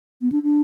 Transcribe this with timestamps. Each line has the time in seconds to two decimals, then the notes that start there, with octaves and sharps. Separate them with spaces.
0.22 B3
0.32 D4
0.43 D4